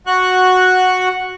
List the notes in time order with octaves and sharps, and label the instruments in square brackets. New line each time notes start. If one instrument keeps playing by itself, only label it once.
[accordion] F#4 C#6 F#6